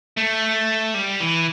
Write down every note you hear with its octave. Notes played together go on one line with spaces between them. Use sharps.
A3
G3
E3